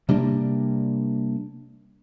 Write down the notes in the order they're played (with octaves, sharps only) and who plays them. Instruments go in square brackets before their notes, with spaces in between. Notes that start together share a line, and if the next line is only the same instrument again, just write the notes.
[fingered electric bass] C3 G3 A#3 D4